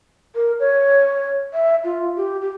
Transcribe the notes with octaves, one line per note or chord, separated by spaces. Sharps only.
A#4
C#5
E5
F4
G4
G4